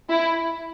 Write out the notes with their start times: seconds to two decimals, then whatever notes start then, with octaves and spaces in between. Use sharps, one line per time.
0.10 E4